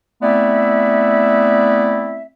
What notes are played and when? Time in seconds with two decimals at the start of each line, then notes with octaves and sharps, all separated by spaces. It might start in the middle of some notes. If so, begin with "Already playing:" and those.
0.22 A3 B3 C4 E4 D5 E5